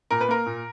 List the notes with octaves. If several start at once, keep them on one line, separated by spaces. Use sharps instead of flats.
A#2 A#4
B4
A#3 A#4
A#2